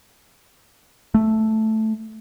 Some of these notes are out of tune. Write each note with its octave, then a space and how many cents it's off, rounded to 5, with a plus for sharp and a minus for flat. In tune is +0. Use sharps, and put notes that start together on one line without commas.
A3 -5